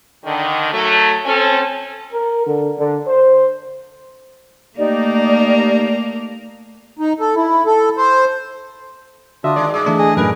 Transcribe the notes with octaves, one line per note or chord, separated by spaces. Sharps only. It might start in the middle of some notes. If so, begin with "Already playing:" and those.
D3 D#3
F#3 A3
C4 C#4 A4
A#4
D3
D3
C5
A3 A#3 D#4 G4 A#4 D5
D#4
A4
E4
A4
C5
D3 D4 F4 F#4 D#5 E5
D#3 G#3 D5
G2 G#3 D5 E5 D#6
E3 A3 D4
G#4 D#5
F#2 A2 G#4 A#4 B4